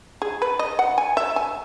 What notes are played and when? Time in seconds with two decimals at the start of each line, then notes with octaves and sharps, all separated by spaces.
0.22 G#4
0.42 B4
0.59 D#5
0.79 F#5
0.98 G#5
1.17 E5
1.36 G#5